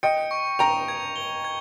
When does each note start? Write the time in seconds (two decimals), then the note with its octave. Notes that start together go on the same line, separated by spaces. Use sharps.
0.03 D#5 G5 C#7
0.31 C#6
0.59 G5 A#5 F7
0.88 G#6
1.16 G7
1.44 G#6